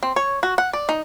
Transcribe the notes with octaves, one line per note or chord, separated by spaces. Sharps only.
C4
C#5
F#4
F#5
D5
D#4